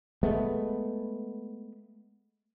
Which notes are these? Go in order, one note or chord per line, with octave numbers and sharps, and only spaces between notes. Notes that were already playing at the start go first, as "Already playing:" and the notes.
G#3 A3 B3